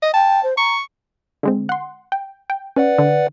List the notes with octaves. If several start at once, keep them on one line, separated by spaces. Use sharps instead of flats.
D#5
G5 A5
C5
A#5 C#6
D3 G#3 C4
F#5 C6
G5
G5
C#4 B4 D5 F#5
D3